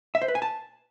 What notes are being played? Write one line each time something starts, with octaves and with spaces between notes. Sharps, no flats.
E5
C5
B4
G#5
A5